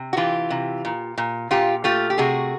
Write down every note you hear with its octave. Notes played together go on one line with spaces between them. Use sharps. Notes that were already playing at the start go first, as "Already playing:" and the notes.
Already playing: C3
F#4
E3 F4 G4
C3
A#2
A#2
A#2 F4 G4
A3 F4 G4
G4
C3 F#4 G#4